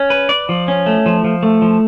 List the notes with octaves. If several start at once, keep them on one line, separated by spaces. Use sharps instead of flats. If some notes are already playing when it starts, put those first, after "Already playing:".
Already playing: C#4
B4
D5
F3
C#4
A3
F3
F3
A3
F3